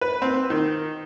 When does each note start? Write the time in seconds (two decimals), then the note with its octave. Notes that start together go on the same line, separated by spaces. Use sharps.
0.01 B4
0.22 C4
0.50 D#3